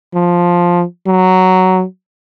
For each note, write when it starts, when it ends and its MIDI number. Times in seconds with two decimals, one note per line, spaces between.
0.14 0.84 53
1.07 1.84 54